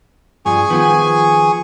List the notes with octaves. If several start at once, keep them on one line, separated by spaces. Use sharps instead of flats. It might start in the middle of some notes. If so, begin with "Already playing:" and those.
G2 F3 G#4 G#5 C#6
D#3 F3 B3